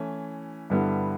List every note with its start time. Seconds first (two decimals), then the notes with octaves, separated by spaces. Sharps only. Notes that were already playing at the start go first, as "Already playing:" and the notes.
Already playing: E3 A3 C#4
0.70 G2 D3 G3 B3 E4